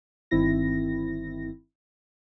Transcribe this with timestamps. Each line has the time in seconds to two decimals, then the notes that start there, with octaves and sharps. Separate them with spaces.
0.31 G1 D#3 C4 E4 A#6